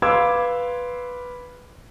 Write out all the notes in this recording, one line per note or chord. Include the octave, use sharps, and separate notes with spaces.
B4 F5 C6 D6 E6 G#6